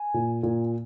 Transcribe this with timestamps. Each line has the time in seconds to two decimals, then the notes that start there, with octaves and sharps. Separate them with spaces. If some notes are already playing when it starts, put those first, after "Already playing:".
Already playing: G#5
0.14 A#2
0.43 A#2